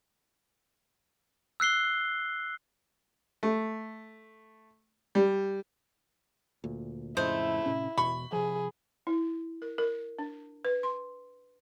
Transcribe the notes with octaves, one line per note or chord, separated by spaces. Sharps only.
E6 F#6 C7 G7
A3
G3
D2 A#2
F2 A2 C#3 G#3 A3 E4 C5
A2 C3 C#4
E1 B2 B5 C#6
C3 F3 G#4
E4
A#4
A#4
D4
B4
C6